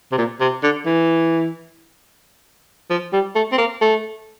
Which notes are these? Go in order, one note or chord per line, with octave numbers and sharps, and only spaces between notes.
C3
A#2
C3
D3
E3
F3
G3
A3
C4
A#3
A3